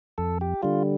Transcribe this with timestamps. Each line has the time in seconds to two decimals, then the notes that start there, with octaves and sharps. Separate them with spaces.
0.18 F2 A4
0.41 G4
0.63 D3 G3 F4